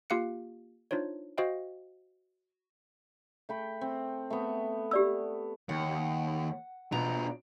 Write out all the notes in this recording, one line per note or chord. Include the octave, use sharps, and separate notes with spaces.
A#3 F4 G4 F5 F#6 C#7
D4 D#4 F4 C5 C#5
F#4 C5 D#5 F5 G5
A3 G5 B5
C4
A3 B3
G4 D5 E6
D#2 F#5
B2 D4 F4 A#5